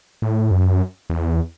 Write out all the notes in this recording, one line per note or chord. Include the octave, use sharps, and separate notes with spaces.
A2
F#2
E2